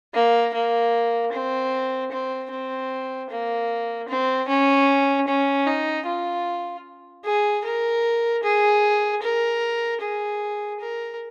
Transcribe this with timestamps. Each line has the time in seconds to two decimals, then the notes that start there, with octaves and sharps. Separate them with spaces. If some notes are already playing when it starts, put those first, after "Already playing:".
0.14 A#3
0.54 A#3
1.32 C4
2.12 C4
2.51 C4
3.30 A#3
4.09 C4
4.48 C#4
5.28 C#4
5.66 D#4
6.06 F4
7.25 G#4
7.65 A#4
8.43 G#4
9.22 A#4
10.01 G#4
10.80 A#4